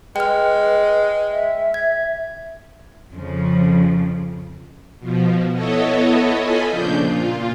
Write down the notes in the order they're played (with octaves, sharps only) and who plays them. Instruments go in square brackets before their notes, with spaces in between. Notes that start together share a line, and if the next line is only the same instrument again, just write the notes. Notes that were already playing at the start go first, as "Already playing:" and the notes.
[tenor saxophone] G#3 [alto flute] B4 [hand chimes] G5 F6
[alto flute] E5
[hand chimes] G#6
[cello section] F2 C#3 F3
[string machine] B2 F3
B3 E4 A4 C#5 D#5
F4 A4 D#5 G#5 B5
A#2 C#3 F3 D4 G6
A#2 F4